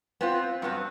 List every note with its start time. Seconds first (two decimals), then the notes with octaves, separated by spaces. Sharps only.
0.21 B3 C4 F4
0.62 G2 F#3 B3 C4